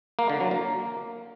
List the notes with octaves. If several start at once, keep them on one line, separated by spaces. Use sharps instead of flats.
A#3
D3
F#3
A#3